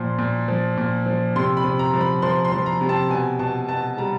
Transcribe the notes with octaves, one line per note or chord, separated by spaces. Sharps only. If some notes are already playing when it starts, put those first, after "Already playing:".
Already playing: A#2 F3 C6
A#2
F3
A#2
F3
C3 C6
B5
C3
A#5
F3
B5
F3 C6
C6
F3
A#5
C3
A5
B2 G#5
B2 A5
B2 A5
G3 A#5